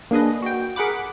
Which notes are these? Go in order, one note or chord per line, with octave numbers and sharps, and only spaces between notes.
A#3 D4 G#4 B4 D#5
F#4 G5
G#4 A#4 F#5 B5 D6